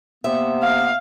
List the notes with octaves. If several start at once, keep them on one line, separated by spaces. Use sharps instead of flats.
C3 A#3 B3 E5
F5